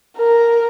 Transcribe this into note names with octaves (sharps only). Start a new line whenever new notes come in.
A#4